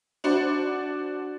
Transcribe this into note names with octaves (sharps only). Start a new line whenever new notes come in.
D4 F#4 C5 D5